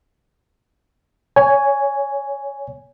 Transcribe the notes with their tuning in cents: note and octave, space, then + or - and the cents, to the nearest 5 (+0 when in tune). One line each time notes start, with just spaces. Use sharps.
C#5 +20 G#5 +0